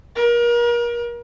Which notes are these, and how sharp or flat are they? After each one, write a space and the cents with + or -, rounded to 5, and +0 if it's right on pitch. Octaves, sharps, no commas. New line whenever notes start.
A#4 +35